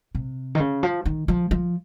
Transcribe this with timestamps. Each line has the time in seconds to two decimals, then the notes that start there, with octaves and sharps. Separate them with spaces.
0.15 C3
0.55 D#3
0.60 C#3
0.83 F3
1.05 D#3
1.28 F3
1.51 F3